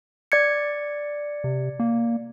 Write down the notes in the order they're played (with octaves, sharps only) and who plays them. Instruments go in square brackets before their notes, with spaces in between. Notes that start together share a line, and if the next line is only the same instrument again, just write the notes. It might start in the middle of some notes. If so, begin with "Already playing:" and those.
[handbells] D5 G#6 C#7
[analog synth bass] C3
A#3